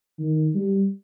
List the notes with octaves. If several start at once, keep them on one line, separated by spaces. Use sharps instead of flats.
D#3
G3